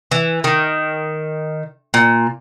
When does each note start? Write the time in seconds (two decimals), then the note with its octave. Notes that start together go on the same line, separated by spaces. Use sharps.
0.11 E3
0.44 D#3
1.94 A#2